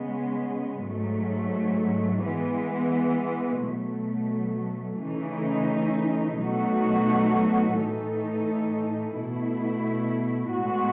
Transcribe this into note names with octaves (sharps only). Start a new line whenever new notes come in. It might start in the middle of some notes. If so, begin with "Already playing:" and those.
Already playing: C#3 G#3 B3
G#2 F#3 A3
E3 G#3 B3
B2 F#3 A3
C#3 E3 A3 D#4
B2 F#3 A3 D#4 F#4
A2 E3 A3 D#4 A4
B2 A3 E4
A2 G#3 B3 F#4